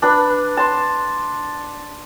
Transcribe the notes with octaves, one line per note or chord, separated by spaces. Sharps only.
D4 B4 B5
A5 C6